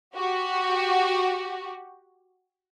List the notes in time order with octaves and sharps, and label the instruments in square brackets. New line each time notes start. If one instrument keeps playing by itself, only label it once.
[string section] F#4 G4